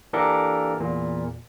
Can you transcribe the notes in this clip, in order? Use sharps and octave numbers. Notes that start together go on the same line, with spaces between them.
E3 A#3 D4 G4 A4 A#4
E2 A#2